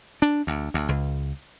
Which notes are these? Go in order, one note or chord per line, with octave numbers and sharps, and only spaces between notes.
D4
D2
D2
C#2